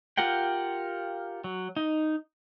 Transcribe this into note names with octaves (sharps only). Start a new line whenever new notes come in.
F4 G4 A#4 F#5 G5
F#3
D#4